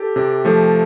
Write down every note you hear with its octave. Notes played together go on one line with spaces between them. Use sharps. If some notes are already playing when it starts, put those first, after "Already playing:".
Already playing: G4 A4
C3
F3 A3